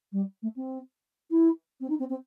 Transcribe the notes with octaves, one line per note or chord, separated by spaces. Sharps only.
G3
A3
C4
E4
C4
D#4
C4
C4